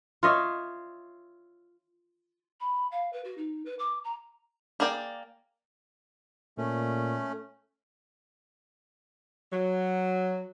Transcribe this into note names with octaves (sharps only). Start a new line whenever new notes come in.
F4 C#5 D#5 E5
B5
F5
B4
F#4
D#4
B4
D6
A#5
A#3 G#4 A#4 D5 G5
A#2 A3 C#4
F#3